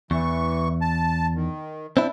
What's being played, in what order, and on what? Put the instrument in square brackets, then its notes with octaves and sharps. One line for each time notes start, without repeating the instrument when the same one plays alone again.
[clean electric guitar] E2 [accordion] E3 C#6
[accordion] A5
D#3
[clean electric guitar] C4 D4 E4